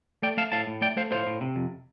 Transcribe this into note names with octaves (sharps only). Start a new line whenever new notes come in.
A3 D5 G5
A3 F5 A5
A2 F5 A5
A2
A3 D5 G5
A3 C5 F5
A2 C5 F5
A2
C3
F2